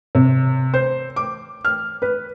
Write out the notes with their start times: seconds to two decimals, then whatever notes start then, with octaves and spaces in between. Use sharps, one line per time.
0.15 C3
0.74 C5
1.16 D6
1.65 F6
2.02 B4